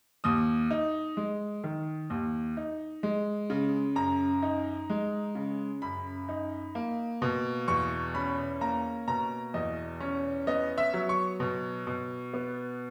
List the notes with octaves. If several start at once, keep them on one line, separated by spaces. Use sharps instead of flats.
D#2 D#6
D#4
G#3
D#3
D#2
D#4
G#3
C#3
F#2 A#5
D#4
G#3
C#3
F#2 B5
D#4
A#3
B2
E2 C#6
C#4 B5
A#3 A#5
B2 A#5
E2 D#5
C#4
B3 D#5
E5
F#3
C#6
B2
B2
B3